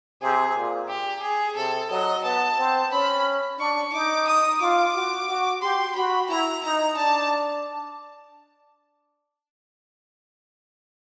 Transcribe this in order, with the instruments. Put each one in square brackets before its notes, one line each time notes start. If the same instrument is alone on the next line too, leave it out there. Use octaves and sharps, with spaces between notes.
[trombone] C3 [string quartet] G#4
[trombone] A#2
[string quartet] G4
G#4
[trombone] C3 [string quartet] A4
[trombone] F#3 [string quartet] D#5
[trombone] B3 [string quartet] A5
[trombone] C4
[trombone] C#4 [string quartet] B5
[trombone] D4 [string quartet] C#6
[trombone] D#4 [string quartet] D6
[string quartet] D#6
[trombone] F4 [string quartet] D6
[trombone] F#4
F#4
[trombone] G4 [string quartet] C6
[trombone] F#4 [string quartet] B5
[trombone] E4 [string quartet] A#5
[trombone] D#4 [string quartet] A#5
[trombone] D4 [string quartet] A5